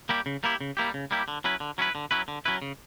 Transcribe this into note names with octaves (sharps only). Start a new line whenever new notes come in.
G3 A#3 E4 G4
C#3
G3 A#3 E4 G4
C#3
G3 A#3 E4 G4
C#3
G3 A#3 E4 G4
D3
F#3 C#4 E4 B4
D3
F#3 C#4 E4 B4
D3
F#3 C#4 E4 B4
D3
F#3 C#4 E4 B4
C#3